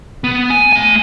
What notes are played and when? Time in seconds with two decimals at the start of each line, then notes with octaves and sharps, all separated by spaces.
0.24 B3
0.50 G#5
0.73 A3 G#5